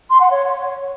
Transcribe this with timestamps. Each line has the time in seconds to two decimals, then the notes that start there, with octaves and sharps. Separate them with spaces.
0.10 C6
0.20 F#5
0.30 C#5